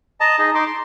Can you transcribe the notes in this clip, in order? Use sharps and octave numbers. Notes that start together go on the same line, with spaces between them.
D#5 A5 A#5
D#4 G#4 D#5
D#4 C6 D6
C6